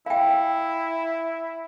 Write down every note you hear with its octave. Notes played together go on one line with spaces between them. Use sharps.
E4 F5 G5